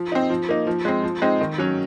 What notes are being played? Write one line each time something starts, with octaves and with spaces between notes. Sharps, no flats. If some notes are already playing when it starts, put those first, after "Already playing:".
Already playing: F3
C4 D#4
F3
A#3 D#4
F3
G#3 C4
F3
G#3 C4 D#4
D#3
F#3 C#4